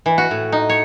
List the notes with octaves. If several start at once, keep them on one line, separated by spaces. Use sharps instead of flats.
E3
F#4
A2
D#4
C#5